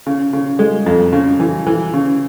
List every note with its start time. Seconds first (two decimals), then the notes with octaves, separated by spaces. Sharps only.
0.07 C#3
0.33 C#3
0.59 G#3
0.86 F2
1.13 C#3
1.40 E3
1.66 E3
1.94 C#3